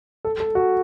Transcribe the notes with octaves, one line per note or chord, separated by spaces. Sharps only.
A4
A4
F#4